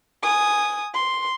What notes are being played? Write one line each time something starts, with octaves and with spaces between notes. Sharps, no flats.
G#5 D#6
C6